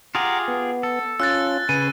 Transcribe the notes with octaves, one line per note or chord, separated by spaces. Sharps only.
F4 G4 G#4 F#5 A#5 D6
B3
A4
C#4 F4 E6 F#6 A6
C#3 B4 G#5 D#7